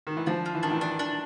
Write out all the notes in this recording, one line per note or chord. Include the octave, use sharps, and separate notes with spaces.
D#3
E3
F3 D4
F4
E3
D#3 D4
E3
D#3 D4
D4